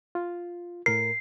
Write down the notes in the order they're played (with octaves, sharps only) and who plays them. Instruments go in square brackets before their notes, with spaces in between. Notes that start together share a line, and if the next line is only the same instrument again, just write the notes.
[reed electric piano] F4
[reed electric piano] A2 A#4 [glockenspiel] C7